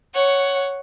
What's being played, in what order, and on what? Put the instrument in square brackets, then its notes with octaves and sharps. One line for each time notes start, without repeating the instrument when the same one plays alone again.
[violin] C#5 F#5